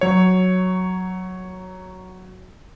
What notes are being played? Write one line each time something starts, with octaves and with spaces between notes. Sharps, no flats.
F#3 C#5